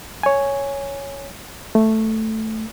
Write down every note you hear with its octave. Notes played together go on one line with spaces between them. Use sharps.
C#5 G#5
A3